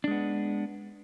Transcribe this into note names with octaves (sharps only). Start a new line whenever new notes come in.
G#3 B3 D4